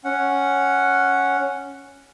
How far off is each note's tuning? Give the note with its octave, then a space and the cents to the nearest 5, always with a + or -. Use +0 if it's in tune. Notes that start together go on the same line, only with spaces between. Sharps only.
C#4 +0 F#5 +0